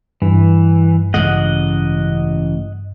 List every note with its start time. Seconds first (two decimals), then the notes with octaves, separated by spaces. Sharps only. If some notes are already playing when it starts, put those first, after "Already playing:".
0.22 G2 E3
1.14 A1 C#3 G#3 D#5 F#5